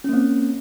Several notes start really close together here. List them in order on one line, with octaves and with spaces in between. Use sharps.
C#4 A#3 C4